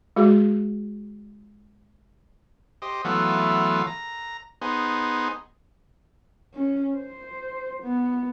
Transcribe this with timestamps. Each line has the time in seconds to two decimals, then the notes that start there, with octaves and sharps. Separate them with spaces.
0.16 G#3 F#4 G#4
2.82 G4 C5 D#5
3.05 E3 F#3 A3 B3 F4
3.87 A#5
4.61 B3 D#4 G#4 C5
6.54 C#4
6.96 C5
7.83 B3